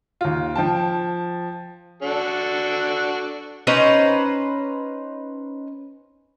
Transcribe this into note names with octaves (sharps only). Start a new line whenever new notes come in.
D#2 F4
F3 G5 A5
D4 F#4 A4
C#4 D#4 B4 C5